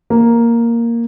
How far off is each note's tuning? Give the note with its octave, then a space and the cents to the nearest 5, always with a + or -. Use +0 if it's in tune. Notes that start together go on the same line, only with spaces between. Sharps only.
A#3 +0